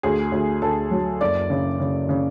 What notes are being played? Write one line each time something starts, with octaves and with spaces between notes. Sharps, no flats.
D2 G#4
D2
D2 A4
F#3
F#1 D5
C#3
C#3
C#3